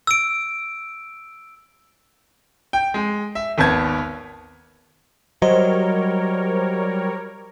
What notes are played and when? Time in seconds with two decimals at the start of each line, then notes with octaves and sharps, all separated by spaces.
0.07 E6 D7
2.73 G5
2.94 G#3
3.35 E5
3.58 G#1 D#2 B3 A5 G#6
5.42 F#3 G3 A#4 C5 C#5 D#5